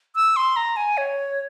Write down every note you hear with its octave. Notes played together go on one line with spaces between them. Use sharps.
E6
C6
A#5
G#5
C#5